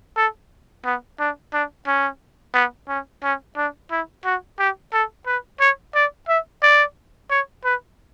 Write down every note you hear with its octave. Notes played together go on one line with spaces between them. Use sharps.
A4
B3
D4
D4
C#4
B3
C#4
C#4
D4
E4
F#4
G4
A4
B4
C#5
D5
E5
D5
C#5
B4